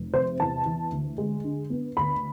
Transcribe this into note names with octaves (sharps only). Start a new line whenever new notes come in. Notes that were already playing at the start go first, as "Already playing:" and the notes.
Already playing: F1
C3 C5
E2 A5
E3
D2
G#3
D3
B3
D2 B5